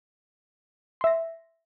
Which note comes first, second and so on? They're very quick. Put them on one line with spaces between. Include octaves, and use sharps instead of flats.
C6 E5 A#6